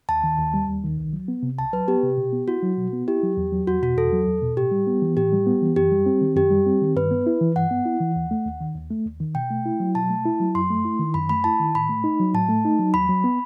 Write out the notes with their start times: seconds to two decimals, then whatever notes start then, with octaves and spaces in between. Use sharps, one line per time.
0.09 D#2 A5
0.24 D#3
0.39 D#2
0.54 G3
0.68 D#2
0.84 D#3
0.98 C2
1.13 F#3
1.28 B3
1.43 C3
1.58 C2 A5
1.73 F#3 B4
1.88 B3 G4
2.03 C3
2.18 B2
2.33 B3
2.48 E4 F#4
2.63 F#3
2.78 B2
2.93 B3
3.08 E4 G4
3.23 F#3
3.37 E2
3.52 F#3
3.67 E2 F#4
3.82 B2 F#4
3.97 E2 A4
4.12 F#3
4.27 E2
4.42 B2
4.57 A2 G4
4.71 G3
4.87 B3
5.02 E3
5.17 A2 G4
5.32 G3
5.46 B3
5.62 E3
5.76 F#2 G4
5.92 G3
6.06 C4
6.21 D#3
6.36 F#2 G4
6.51 G3
6.66 C4
6.81 D#3
6.96 G2 B4
7.11 B3
7.26 E4
7.41 E3
7.56 G2 F#5
7.71 B3
7.86 E4
8.01 E3
8.16 D#2
8.31 A3
8.45 D#2
8.61 D#3
8.75 D#2
8.90 A3
9.06 D#2
9.20 D#3
9.35 B2 G5
9.50 A3
9.65 E4
9.80 F#3
9.95 B2 A5
10.10 A3
10.25 E4
10.40 F#3
10.55 F#2 C6
10.70 A3
10.85 E4
11.00 D#3
11.14 F#2 B5
11.29 A3 B5
11.44 E4 A5
11.60 D#3
11.75 A2 B5
11.89 A3
12.04 D#4
12.19 F#3
12.34 A2 A5
12.49 A3
12.65 D#4
12.79 F#3
12.94 D#2 B5
13.09 F#3
13.24 B3